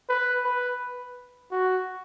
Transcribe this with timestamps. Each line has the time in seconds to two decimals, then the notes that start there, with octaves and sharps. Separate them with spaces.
0.09 B4
0.44 B4
1.51 F#4